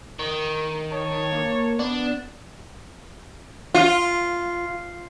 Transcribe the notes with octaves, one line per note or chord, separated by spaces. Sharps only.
D#3
C#5 A5
A#3
B3 D4
F4